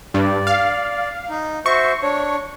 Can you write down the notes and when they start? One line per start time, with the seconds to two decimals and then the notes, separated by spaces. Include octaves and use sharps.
0.14 G2 D5
0.47 F5
1.29 D#4
1.66 F#4 C5 E5 C#6
2.03 D4 C#5